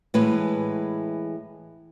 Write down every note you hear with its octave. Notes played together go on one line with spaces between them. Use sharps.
A2 E3 G#3 B4